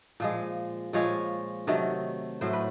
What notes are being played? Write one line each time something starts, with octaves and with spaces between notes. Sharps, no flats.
A#2 F3 G#3
A#2 F3 G#3 C#5
C3 D#3 F#3 A3
A2 F#3 A3 C5
B4